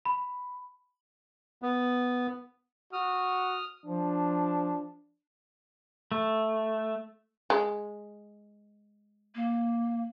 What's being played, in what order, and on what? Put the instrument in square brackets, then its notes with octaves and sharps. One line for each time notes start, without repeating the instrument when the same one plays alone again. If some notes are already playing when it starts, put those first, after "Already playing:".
[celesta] B5
[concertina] B3
[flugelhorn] F#4 [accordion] D#6 F6
[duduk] F3 [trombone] D4
[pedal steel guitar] A3
[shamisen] G#3
[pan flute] A#3